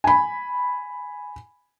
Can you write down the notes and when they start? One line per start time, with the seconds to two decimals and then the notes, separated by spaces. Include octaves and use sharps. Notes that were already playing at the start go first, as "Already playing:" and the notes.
0.04 G#5 B5